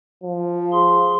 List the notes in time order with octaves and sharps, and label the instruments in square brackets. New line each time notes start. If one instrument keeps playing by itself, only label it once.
[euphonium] F3
[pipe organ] G#4 C6